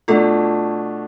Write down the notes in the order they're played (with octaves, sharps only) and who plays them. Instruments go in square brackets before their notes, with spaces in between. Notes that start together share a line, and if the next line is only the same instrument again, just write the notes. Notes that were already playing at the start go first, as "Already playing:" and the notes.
[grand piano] B2 A3 D4 [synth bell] F4 A4